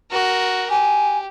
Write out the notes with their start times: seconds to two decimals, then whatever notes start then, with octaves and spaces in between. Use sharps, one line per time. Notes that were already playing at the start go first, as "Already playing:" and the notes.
0.11 F#4 A#4
0.70 G4 G#5